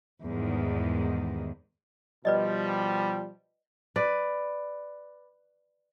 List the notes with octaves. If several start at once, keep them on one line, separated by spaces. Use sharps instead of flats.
E2 G#2 D#3 G3
B2 F3 G3 B4 D5 D#5
B4 D5